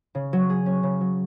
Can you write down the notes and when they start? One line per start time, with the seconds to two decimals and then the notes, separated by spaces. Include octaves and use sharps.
0.15 C#3
0.33 F#3
0.50 G#4
0.66 C#4
0.83 C#3
1.01 F#3